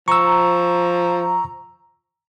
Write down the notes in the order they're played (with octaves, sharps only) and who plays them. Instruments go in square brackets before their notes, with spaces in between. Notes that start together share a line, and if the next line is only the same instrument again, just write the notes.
[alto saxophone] F3 [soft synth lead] A#5 [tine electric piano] C#6 E6